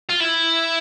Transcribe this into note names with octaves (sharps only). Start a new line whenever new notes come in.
F4
E4